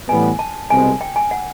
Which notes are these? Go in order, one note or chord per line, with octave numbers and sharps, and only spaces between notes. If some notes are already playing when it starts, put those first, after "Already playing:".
A2 E3 G3 B3 G#5
A5
C2 B2 G#3 C4 G#5
G5
G#5
F#5